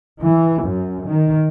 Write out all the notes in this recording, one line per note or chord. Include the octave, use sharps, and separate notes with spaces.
E3
F#2
D#3